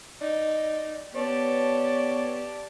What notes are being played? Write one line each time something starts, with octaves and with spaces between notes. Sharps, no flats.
D#4 D5
B3 G4 C#5 D5 A5